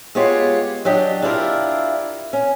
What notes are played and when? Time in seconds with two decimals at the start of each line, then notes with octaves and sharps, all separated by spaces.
0.15 G#3 B3 F4 G4 C#5
0.85 F#3 D4 G4 D#5
1.22 D4 E4 F4 G4 A4 A#4
2.33 C#4